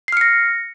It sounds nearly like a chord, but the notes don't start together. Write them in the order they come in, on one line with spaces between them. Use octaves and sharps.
C7 F6 C#7 A#6